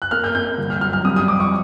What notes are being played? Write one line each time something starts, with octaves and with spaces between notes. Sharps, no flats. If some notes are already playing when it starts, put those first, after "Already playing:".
F#6
A#3 F6
G6
A#3 G6
G1
F6
F#3 F6
F6
G3 D#6
D#6
F2 D6
C#6